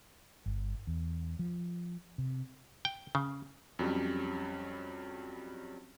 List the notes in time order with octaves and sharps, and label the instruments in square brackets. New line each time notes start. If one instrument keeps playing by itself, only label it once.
[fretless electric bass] G1
E2
F3
C3
[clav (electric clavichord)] G5
C#3
[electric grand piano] F2 F#3 G3 C#4